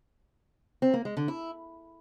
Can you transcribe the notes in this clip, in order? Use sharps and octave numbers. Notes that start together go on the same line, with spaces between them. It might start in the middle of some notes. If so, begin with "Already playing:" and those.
C4
A#3
G#3
D3
E4